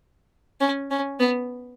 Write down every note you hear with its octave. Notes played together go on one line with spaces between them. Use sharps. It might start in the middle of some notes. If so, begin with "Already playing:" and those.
C#4
C#4
B3